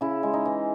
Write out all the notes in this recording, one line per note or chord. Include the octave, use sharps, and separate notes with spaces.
C#3 E4
G#3
D#4
E3